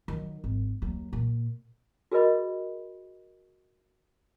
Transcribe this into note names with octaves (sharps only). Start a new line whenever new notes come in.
D#3 F#3
G#1
D#2 F#3
A#2
F#4 G#4 A#4 B4 D#5 B5